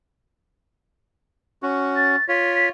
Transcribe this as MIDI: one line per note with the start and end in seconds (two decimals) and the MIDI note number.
1.63 2.16 61
1.63 2.16 66
1.96 2.27 93
2.28 2.69 65
2.28 2.69 73
2.28 2.53 95
2.55 2.66 95